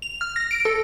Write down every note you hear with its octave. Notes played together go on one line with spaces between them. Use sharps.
F7
F6
A#6
D7
A4